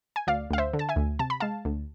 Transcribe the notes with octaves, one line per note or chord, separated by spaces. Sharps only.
G#5
D2 D5 F5
D2 F5
C5 E5
D3
A5
E5 G#5
D2
C3 A5
B5
G#3 F5 A5
D2